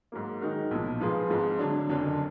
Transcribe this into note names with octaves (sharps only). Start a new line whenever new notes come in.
G#2 F#3 A#3
D#3 G#3 D#4 F#4 A#4
B1 A#2 F3
G#2 F3 B3 F4 G#4
G#1 G#2 F3 G#3
D3 F#3 D4
F#1 F2 D3 F#3 D4